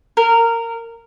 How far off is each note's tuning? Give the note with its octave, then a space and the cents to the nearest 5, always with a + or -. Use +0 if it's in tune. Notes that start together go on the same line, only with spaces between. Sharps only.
A#4 -15